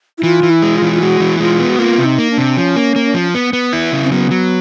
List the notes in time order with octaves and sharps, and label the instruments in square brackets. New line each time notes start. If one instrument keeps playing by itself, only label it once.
[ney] E4
[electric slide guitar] E3 [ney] F4
[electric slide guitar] E3
[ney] E4
[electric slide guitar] G#3
[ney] F4
[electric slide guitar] E3
[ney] F4
[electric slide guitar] G#3 [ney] F#4
[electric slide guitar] E3
[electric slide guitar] G#3 [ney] F4
[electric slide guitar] B3
[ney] F#4
[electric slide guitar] A#3 [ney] F4
[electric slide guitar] C3
[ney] D#4
[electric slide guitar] A#3
[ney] D4
[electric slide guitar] C3
[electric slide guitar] F3 [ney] C#4
[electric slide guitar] A#3
A#3
F3
B3
B3
E4
C#3
[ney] C4
[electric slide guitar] F#3 [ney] B3
[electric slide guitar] F#3